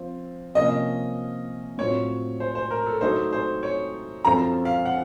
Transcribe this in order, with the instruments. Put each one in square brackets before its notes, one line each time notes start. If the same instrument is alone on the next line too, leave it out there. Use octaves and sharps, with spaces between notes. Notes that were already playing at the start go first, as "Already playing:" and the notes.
Already playing: [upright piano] F3 C4 F4
[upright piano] C3 F3 A#3 C#4 [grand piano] D#5
[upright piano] A2 F#3 C4 F4 [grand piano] C#5
[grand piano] C5
C5
A#4
A4
[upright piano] F#3 A3 D#4 [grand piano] C5
[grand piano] C5
C#5
[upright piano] F#2 F3 C4 F4 A4 [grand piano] A#5
[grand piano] F5
F#5